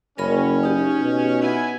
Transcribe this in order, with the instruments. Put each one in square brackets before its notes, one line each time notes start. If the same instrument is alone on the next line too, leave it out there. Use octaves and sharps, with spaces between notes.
[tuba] F#1 [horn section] C#4 [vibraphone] A#4 B5
[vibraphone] D#4 G4
[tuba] B2
[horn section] B3 E4 G#5